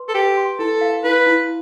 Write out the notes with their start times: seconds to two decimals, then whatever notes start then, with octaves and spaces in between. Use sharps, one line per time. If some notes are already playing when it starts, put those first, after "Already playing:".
Already playing: B4 C6
0.09 A4
0.15 G4 B4
0.37 C6
0.59 E4 A4
0.81 F5
1.04 E4 B4
1.26 E4